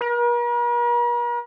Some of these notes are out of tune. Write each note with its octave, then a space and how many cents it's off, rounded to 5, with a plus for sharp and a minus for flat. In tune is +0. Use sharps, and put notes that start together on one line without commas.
A#4 +45